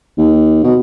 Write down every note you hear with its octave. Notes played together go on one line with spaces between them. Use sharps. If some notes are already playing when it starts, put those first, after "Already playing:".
D#2
B2